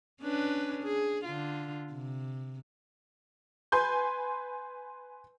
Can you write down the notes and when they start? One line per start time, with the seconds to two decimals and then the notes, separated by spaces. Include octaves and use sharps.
0.22 C#4 D4 B4
0.83 G#4
1.25 D3 F4
1.93 C3
3.72 B4 G#5 C6 G6